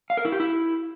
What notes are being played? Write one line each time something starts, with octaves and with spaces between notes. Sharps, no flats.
F5
A#4
E4
G4
E4